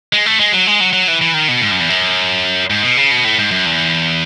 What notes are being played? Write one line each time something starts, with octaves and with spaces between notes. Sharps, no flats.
G#3
A3
G#3
F#3
G#3
F#3
F#3
E3
E3
D#3
B2
G#2
F#2
E2
F#2
G#2
B2
C#3
B2
A2
G#2
F#2
E2